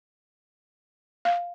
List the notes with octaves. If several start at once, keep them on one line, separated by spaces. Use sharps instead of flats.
F5